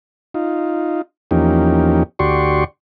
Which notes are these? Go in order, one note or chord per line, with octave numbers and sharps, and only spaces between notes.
D#4 F4
E2 F3 A#3 C#4 D#4 G4
D2 F#4 G4 D5 C6 C#6